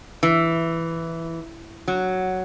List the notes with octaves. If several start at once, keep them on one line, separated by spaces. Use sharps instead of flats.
E3
F#3